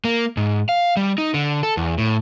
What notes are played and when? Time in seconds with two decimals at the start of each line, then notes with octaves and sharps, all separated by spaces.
0.04 A#3
0.37 G#2
0.69 F5
0.97 G3
1.18 D#4
1.34 D3
1.63 A4
1.77 E2
1.98 A2